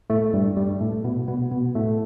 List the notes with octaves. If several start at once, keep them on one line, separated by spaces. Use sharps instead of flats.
A2 A3
G2 G3
G2 G3
A2 A3
B2 B3
B2 B3
B2 B3
A2 A3